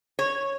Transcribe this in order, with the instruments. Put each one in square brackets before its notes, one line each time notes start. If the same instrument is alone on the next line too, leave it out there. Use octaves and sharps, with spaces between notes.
[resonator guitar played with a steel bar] C#5